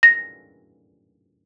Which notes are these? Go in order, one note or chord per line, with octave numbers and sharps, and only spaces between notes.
A#6